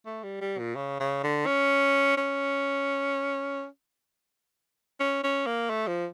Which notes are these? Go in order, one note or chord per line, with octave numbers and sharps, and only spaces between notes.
A3
G3
G3
A#2
C#3
C#3
D3
C#4
C#4
C#4
C#4
A#3
A3
F3